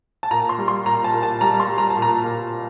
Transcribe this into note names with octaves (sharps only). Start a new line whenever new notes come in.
A5
A#2 A#5
C6
G3
C6
A#2 A#5
A5
A#2
A5
G3 A#5
C6
G3
A#5
A5
A#2
A#5
A#2